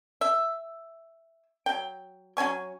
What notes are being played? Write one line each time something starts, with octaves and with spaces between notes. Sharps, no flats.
E5
F#3 G5
F#3 C#4 G#5 C#6